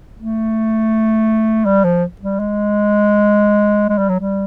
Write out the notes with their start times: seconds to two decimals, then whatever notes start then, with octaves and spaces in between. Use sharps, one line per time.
0.17 A3
1.65 G3
1.85 F3
2.21 G3
2.40 G#3
3.89 G#3
3.98 G3
4.09 F#3
4.20 G3